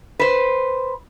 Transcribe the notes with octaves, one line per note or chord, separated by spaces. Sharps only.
B4 C5